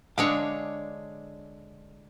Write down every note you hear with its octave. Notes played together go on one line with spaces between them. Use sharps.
D3 G#3 D4 C#5 F5